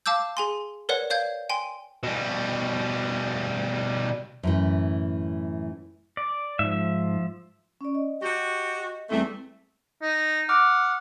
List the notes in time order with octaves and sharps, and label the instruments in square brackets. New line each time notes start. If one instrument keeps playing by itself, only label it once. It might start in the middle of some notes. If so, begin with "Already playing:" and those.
[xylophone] F5 A5 D6 E6 G6
G#4 G#5 C6
A#4 B4 C#5 D5 F#5
C#5 D5 F5 G6 G#6
G5 G#5 C6
[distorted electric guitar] B2 G3
[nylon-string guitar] F#2 A2 E3
[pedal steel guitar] D5
[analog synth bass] G#2 [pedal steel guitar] F3 E5
[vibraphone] C#4 D5
D#5
[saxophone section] F#4 G4
[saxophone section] E2 A3 [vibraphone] G3 C4 A4
[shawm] D#4
[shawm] F#5 [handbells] D6 F6